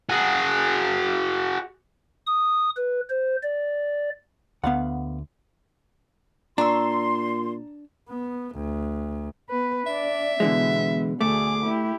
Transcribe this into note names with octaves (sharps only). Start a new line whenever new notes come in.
F#4 G#4
D#6
B4
C5
D5
D2 B3 F5 F#5
A#2 D4 A#5 C6 C#6 E6
B3
D2
B3 B4
D4 D5 E5
B2 D3 E3 G#3 B3
D2 A3 G#4 D6
E4 G4